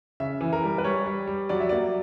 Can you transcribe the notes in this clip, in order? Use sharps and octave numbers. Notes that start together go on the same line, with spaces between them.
C#3 E5
E3
A#4
G3
B4
G3 C#5
G3
G3
F#3 D5
E5
A#3 D5